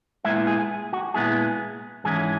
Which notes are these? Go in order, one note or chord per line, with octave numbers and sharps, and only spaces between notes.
A#2 G#3 B3 E4 E5
G#4
F#4
A#2 G#3 B3 E4 G#4
G#2 E3 G#3 C#4 E4 G#4